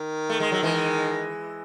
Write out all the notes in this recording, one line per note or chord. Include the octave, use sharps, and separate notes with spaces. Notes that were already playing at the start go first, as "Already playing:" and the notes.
Already playing: D#3
A3
G#3
F#3
E3 G#3